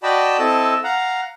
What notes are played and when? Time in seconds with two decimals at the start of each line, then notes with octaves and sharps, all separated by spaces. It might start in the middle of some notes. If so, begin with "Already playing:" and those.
0.03 F#4 D5 D#5 G5 A5 B5
0.39 C4 E4 A4 D#5 A5
0.84 F5 F#5 A#5